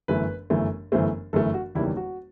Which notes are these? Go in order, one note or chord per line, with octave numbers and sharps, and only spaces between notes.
G1 F#2 E3 A3 B4
G1 F#2 E3 A3
G1 F#2 E3 A3 C5
G1 F#2 E3 A3 A4
F#4
F#1 E2 D#3 G3 E4
F#4